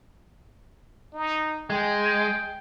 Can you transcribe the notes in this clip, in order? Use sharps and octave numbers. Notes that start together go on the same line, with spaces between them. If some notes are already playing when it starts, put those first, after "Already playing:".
D#4
G#3 G5